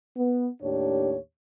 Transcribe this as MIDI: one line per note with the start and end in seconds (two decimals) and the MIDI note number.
0.16 0.49 59
0.62 1.16 39
0.62 1.16 45
0.62 1.16 62
0.62 1.16 67
0.62 1.16 73